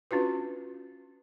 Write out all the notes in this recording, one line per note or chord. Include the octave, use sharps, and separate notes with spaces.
C#4 D4 F4 F#4 B4